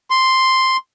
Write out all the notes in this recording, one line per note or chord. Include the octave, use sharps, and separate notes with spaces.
C6